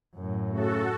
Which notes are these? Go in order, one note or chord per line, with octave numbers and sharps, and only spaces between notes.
F#2 A2
C#3 A3 F#4 A4